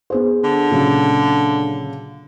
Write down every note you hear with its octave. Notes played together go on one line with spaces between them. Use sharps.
B3 G#4 C5
D3
A#2 C#3 F#3